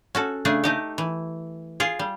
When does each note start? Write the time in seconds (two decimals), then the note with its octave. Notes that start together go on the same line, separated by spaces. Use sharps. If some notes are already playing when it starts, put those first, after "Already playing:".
0.15 C#4 F#4 A4
0.45 C#3 A3 D4 G#4
0.64 A3 D#4 G4
0.98 E3
1.80 F4 G#4
1.99 G3